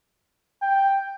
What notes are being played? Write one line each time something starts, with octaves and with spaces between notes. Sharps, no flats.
G5